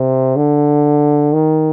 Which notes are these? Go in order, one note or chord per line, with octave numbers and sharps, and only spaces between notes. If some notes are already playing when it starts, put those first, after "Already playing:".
Already playing: C3
D3
D#3